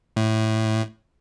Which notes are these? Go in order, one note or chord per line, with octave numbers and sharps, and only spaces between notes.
A2